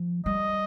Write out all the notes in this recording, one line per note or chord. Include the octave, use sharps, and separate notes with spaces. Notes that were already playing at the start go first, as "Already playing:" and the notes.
Already playing: F3
G3 D#5